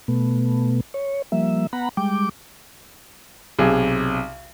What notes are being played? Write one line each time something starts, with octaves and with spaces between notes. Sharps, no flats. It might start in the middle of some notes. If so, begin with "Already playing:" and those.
B2 A3 B3
C#5
F3 G3 A#3 E5
B3 F#5 A#5 B5
G3 G#3 G5 D6
B1 C3 G#4